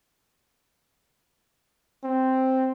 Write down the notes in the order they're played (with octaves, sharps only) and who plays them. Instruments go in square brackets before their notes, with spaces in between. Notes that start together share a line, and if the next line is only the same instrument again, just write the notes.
[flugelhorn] C4